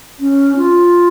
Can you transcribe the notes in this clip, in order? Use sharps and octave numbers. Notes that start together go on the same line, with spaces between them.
C#4
F4